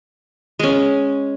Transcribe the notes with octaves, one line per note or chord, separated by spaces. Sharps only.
G#3 C#4